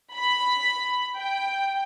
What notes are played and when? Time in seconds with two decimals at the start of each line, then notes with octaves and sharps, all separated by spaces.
0.15 B5
1.18 G5